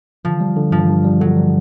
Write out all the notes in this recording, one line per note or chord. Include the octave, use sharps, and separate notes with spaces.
D3 F3
G3
D3
G2 F3
G2
G3
D3 F#3
G3